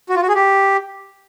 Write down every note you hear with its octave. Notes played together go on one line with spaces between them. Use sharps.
F#4
F4
F#4
G#4
G4